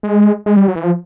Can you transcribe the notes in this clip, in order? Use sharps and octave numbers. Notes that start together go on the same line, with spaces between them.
G#3
G#3
G3
F#3
E3
F3